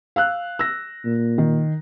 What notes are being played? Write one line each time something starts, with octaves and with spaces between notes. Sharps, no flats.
F5 E6 F#6
E6 A#6
A#2
D#3